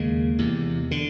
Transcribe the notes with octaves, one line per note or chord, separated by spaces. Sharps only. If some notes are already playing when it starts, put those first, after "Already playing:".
Already playing: D#2 C#3 G#3 A#3
E2 C3
D3